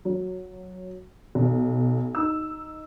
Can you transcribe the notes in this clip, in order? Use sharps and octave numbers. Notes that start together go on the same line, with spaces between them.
F#3
B1
D#4 E6